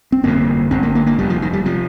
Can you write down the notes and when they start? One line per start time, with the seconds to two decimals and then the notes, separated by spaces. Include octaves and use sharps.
0.12 C4
0.23 G1 F2 C3 A#3
0.71 G1 G2 C4
0.83 A#3
0.95 A#3
1.06 A#3
1.18 F1 D#2 G3
1.30 F3
1.42 D#3
1.53 G3
1.65 C3 F3